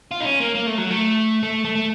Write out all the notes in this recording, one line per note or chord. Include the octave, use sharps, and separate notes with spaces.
F4
D#4
C#4
A#3
A#3
A3
F#3
A3
A3
A3
A3